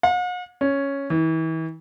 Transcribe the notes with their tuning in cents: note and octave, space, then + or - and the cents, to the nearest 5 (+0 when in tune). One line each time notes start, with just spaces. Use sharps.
F#5 -45
C#4 +0
E3 -35